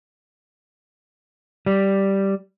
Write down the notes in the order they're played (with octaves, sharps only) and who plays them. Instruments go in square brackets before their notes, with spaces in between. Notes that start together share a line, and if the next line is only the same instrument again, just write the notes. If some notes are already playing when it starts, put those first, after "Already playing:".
[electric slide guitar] G3